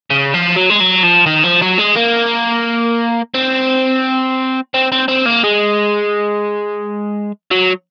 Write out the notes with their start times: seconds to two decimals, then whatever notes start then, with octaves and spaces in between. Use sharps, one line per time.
0.10 C#3
0.34 F3
0.56 F#3
0.70 G#3
0.80 F#3
1.04 F3
1.26 D#3
1.44 F3
1.62 F#3
1.78 G#3
1.96 A#3
3.34 C4
4.74 C4
4.92 C4
5.08 C4
5.26 A#3
5.44 G#3
7.51 F#3